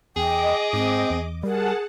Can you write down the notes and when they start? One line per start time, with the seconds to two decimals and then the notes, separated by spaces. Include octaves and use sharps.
0.16 E2 G#4 D#5 G5 D6
0.73 G#2 C4
1.10 E2
1.43 G3 G#4 A#4 F#5 A5